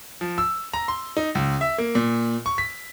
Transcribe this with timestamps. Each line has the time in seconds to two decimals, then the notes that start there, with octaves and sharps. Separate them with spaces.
0.21 F3
0.38 E6
0.74 A#5
0.88 C6
1.17 D#4
1.35 C#2
1.61 E5
1.78 A#3
1.95 A#2
2.46 C#6
2.58 B6